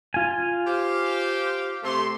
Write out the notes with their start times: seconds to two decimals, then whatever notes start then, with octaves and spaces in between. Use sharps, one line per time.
0.14 F4 G#5
0.66 G4 C5 F5
1.83 C3 A3 C6